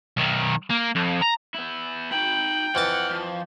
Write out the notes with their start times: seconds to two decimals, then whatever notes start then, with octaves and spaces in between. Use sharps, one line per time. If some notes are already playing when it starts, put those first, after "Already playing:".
0.17 B1 D#3
0.70 A#3
0.95 F2
1.21 A#5
1.55 B3 E4
2.12 D#4 G5 B5 F#7
2.75 F2 E3 F#5 A5 F6
3.10 F3